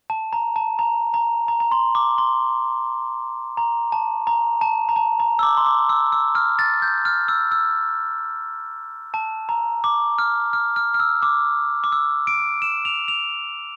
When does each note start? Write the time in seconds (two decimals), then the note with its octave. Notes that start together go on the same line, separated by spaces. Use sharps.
0.10 A5
0.33 A#5
0.56 A5
0.79 A#5
1.14 A#5
1.48 A#5
1.60 A#5
1.72 C6
1.95 D6
2.18 C6
3.57 A#5
3.92 A5
4.27 A#5
4.61 A5
4.89 A#5
4.96 A5
5.20 A#5
5.39 E6
5.43 D6
5.57 C6
5.66 D6
5.89 E6
6.12 E6
6.35 F6
6.59 A6
6.82 G6
7.05 F6
7.28 E6
7.52 E6
9.14 A5
9.49 A#5
9.84 D6
10.19 F6
10.53 F6
10.76 F6
10.94 F6
11.00 E6
11.22 D6
11.84 D6
11.92 E6
12.27 D7
12.62 E7
12.85 F7
13.08 F7